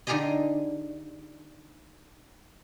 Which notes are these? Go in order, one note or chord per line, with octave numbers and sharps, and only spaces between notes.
D3 D#4 F4 G4 G#4 D#5